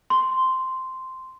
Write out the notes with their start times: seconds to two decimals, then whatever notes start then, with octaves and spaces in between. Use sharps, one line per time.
0.10 C6